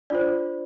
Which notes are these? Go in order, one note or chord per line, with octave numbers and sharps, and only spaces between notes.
D4 F4 C5 D5